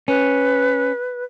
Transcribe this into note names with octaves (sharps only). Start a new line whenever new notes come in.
C#4 B4